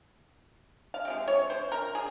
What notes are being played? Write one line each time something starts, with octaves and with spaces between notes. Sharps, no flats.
F5
C3 F3 G#3
C#5
C5
A#4
G#4